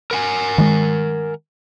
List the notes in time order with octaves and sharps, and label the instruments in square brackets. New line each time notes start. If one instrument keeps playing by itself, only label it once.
[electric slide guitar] A#4 F#5 G#5
[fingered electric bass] D#3 G#3